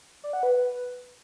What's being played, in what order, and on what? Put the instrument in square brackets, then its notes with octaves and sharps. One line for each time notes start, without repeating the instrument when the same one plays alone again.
[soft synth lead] D5
F#5
B4